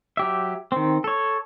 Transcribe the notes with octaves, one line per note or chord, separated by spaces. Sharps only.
F#3 G4 E5
D#3 C4
A4 C#5